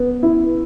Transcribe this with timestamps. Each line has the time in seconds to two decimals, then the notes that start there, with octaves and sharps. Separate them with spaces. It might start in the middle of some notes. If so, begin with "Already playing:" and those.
Already playing: B3
0.23 E4